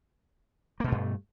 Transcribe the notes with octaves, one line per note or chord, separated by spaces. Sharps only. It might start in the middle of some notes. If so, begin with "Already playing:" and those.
G2 B2 A3 A#3